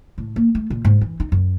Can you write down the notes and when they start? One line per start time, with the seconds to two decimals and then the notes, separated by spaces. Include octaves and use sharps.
0.18 A2
0.36 A#3
0.55 A3
0.70 A#2
0.85 G#2
1.01 E3
1.20 D#4
1.32 F#2